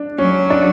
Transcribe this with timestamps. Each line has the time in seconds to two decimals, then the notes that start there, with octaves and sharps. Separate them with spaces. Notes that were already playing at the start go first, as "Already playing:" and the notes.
Already playing: D4
0.18 F#3 C#4
0.50 D4